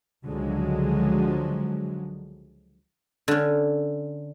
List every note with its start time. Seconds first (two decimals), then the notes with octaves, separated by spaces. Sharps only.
0.25 C#2 D3 F3 F#3 G#3
3.28 D3 C#4